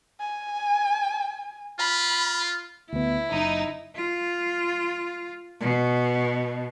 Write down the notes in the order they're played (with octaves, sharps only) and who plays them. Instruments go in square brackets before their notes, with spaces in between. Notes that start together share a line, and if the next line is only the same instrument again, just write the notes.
[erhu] G#5
[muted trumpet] F4 [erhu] B5
[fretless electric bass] D2 B3 [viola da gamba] E4
[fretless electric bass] F#1 [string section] D#4
[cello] F4
B2